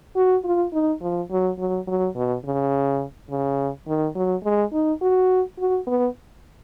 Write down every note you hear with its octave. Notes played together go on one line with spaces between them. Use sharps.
F#4
F4
D#4
F3
F#3
F#3
F#3
B2
C#3
C#3
D#3
F#3
G#3
D#4
F#4
F#4
B3